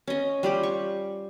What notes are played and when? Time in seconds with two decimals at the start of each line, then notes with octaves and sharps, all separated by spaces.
0.07 C#4 D#5
0.43 G3 F4 G4
0.63 C#6